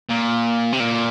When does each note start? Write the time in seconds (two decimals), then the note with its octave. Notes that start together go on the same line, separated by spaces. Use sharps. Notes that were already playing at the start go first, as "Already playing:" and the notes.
0.09 A#2
0.73 C3
0.80 A#2